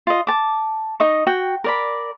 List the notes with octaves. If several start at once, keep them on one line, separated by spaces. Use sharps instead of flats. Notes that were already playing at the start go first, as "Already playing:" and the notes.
F4 D#5
A5 D6
D#4 D#5 C#6
F#4 G5
A#4 D5 B5